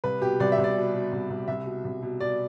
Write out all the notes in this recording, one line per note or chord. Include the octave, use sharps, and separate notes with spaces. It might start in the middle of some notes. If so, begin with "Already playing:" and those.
C2 B4
B2 G4
C2 D5
E5
C2
D5
B2
B2
C2
C2
C2 E5
B2
C2
B2
B2 D5